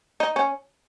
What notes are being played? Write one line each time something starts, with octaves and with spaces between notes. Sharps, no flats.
D#4
C#4